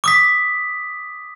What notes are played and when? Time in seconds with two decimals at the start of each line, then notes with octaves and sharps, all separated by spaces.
0.04 D6 D#6 B6